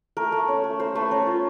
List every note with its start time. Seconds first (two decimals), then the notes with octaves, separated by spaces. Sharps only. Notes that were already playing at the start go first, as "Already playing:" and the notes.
0.17 A3 A#4
0.32 A3
0.48 C#4
0.64 A3
0.79 A3 C5
0.95 A3 B4
1.11 C#4 A#4
1.27 F4